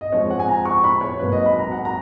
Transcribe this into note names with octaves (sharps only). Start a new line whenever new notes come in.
D#5
F2 F3 G#3 C#5
F#5
G#5
A#5
C#6
C#6
B5
C#5
G#1 G#2 F#3 A#3 B4
D#5
B5
A#5
F#5
A#5